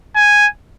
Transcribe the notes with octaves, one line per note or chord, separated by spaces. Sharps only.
G#5